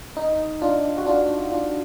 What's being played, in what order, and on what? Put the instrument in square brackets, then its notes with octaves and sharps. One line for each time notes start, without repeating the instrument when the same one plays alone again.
[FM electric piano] D#4
D4 F4
F#4
D4 F4
D4 F4